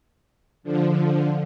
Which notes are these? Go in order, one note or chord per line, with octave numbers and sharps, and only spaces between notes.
D3 F3